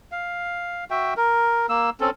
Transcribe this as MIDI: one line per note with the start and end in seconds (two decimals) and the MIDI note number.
0.12 0.85 77
0.91 1.14 66
0.91 1.14 76
0.91 1.14 79
1.17 1.66 70
1.69 1.90 58
1.69 1.90 88
2.00 2.10 60
2.00 2.10 61
2.00 2.10 69